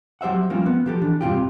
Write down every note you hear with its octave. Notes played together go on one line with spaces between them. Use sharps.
F#3 G4 C5 E5 F#5
F3 G3 A#3 C4 C#4 F4
B3
F3 G4 A4
E3 D4
G2 C3 F4 G4